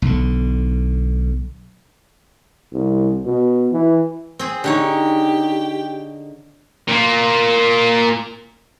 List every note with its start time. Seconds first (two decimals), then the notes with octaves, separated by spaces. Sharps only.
0.02 B1 D3
2.72 C2
3.25 B2
3.73 E3
4.39 C4 G#4
4.64 D3 D#4 G4 C#5
6.88 A#2 A#3